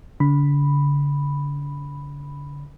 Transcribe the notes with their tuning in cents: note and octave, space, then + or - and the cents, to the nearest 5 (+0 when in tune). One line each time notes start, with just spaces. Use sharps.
D3 -40 B5 +0